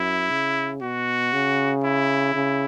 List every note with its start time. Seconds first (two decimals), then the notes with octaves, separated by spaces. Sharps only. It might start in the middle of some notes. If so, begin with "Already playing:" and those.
Already playing: F#2 E4
0.31 C#3
0.81 B2 F#4
1.33 C#3
1.84 E4
2.34 C#3